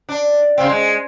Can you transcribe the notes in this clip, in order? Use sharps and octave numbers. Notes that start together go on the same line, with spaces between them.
D4
C#3 C4
G#3